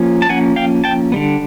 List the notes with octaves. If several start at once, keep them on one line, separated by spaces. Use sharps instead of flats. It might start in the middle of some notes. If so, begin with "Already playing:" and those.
Already playing: F3 A#3 C#4
A5
F3 A#3 C#4 F#5 G#5
F5 G5
G5 A5
D3 G3 B3